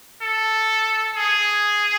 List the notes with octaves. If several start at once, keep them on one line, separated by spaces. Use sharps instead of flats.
A4
G#4